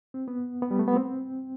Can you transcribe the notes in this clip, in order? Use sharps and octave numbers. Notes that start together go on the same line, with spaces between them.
C4
B3
B3
G3
A3
B3
C4